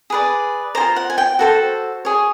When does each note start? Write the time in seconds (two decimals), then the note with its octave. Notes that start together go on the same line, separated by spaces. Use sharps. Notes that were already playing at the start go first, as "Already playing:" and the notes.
0.10 G#4 B4 D5
0.75 G#4 C5 A#5
0.80 F4
0.96 F#5
1.10 G#5
1.18 G5
1.39 F#4 A4 C5
2.05 G#4 C#5